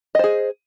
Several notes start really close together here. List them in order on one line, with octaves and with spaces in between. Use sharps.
D#5 C5 G#4